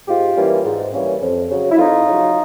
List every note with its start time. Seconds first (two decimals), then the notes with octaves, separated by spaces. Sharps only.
0.08 G#2 F4 G4
0.36 E3 G3 A#3 C#4
0.65 G#2
0.93 E3 G3 A#3 C#4
1.22 F2
1.50 C#3 F#3
1.72 E4
1.78 F2 D#4 F4
2.07 C#3 F#3